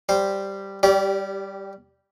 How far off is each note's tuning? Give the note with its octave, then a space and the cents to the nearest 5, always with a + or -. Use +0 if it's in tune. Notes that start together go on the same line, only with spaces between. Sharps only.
G3 +0 C5 +5
G3 +5 G4 -10 D5 -35